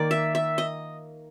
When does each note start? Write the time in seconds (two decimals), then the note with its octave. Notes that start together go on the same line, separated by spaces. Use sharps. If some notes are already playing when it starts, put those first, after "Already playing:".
Already playing: D#3 A#3 D5
0.11 E5
0.35 E5
0.58 D#5